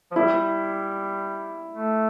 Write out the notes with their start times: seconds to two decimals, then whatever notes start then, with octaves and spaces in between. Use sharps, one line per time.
0.11 F3
0.16 G3 E4
1.73 A3